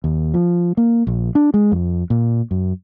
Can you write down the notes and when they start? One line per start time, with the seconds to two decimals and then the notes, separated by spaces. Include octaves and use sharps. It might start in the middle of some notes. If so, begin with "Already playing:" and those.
0.04 D#2
0.34 F3
0.77 A#3
1.07 A#1
1.35 D4
1.54 G#3
1.72 F2
2.10 A#2
2.51 F#2